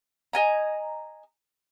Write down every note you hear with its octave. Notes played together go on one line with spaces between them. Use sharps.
D#5 G#5 A#5